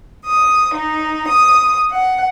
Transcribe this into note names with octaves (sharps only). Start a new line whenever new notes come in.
D#6
D#4
D#6
F#5